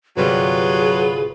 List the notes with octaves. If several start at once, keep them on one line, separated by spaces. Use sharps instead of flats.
G1 C3 F#3 G3 F4 G#4 B4